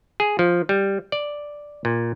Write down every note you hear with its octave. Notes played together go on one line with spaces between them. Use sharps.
G#4
F3
G3
D5
A#2